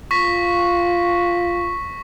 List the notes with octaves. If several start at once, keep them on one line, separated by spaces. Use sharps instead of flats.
F4 C#6 A#6 B6